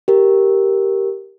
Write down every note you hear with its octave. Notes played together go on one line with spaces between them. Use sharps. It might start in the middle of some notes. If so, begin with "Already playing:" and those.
G4 A#4